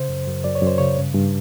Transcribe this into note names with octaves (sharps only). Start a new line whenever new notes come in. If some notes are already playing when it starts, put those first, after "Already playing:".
Already playing: C#3 C5
F#2
F#2
F#2 D5
C#5
F#2
C5
C#3 C#5
G2
G2